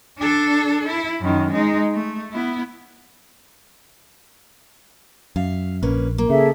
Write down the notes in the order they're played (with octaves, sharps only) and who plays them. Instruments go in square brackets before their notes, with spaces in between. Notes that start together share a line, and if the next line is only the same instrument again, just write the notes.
[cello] D4 A4
E4
F#2 D#3
G#3 D#4
A3
B3 E4
[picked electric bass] F#2 [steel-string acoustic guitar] E5 F5
[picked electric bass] A#1 [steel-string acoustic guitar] A#3 C#4 B4
[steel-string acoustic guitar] A#3
[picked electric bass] C#3 [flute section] G#4 A4 E5